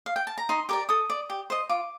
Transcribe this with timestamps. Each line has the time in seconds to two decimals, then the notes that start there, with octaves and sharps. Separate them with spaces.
0.06 F5
0.16 G5
0.27 A5
0.38 A#5
0.49 D#4 C6
0.69 G4 A#4 D5 D6
0.89 A4 D#6
1.10 D5
1.30 G4
1.50 C5 D#5
1.69 F4 D6